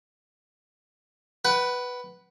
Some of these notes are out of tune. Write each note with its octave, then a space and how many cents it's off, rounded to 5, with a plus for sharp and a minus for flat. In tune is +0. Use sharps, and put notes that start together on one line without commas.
B4 +0 F#5 +25